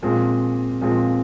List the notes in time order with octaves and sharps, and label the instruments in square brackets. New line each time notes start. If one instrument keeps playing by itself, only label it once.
[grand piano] A#2 F3 G#3 C4 F4
A#2 F3 G#3 C4 F4